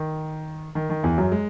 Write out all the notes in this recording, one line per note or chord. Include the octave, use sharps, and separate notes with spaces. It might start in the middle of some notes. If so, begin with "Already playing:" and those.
Already playing: D#3
D#3
D#3
E2 E3
F#2 F#3
G#3